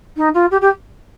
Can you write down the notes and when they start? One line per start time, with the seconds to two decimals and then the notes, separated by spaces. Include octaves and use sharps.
0.16 D#4
0.34 F4
0.51 G4
0.61 G4